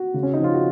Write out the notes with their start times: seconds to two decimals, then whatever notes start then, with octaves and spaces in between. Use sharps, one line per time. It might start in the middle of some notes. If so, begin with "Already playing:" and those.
Already playing: F#4
0.14 C#3
0.23 C#4
0.34 D#4
0.39 F3 F4
0.54 F#4